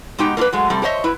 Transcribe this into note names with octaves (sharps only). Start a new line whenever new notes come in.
B2 G#3 D#4 G4 G5
A#3 D4 E4 F4 A#4 B4
F#3 G#3 A3
C3 G3 A3
G4 G#4 C5 C#5 D#5 E5
E4 B4